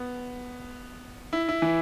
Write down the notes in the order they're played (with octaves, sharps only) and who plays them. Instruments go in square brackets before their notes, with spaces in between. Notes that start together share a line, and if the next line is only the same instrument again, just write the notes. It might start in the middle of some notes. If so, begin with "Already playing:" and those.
Already playing: [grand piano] B3
E4
E4
E3